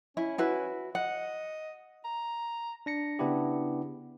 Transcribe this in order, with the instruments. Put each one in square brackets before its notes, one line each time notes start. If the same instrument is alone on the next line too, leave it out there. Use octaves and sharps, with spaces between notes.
[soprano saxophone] C#4 [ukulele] E4
[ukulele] E4 F#4 B4
[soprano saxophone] D#5 [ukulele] F#5
[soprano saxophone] A#5
[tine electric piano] D4 A#6 C#7
C#3 B3 D4 E4 G4